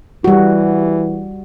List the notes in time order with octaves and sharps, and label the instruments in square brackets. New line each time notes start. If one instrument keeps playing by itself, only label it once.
[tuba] E3 [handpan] G3 F#4